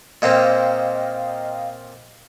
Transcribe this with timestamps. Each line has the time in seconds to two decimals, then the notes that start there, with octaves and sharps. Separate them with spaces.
0.22 A#2 A#3 C4 D#5 F5 G5